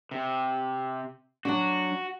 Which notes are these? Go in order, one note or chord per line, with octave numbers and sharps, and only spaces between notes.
C3
F#3 D4 F#4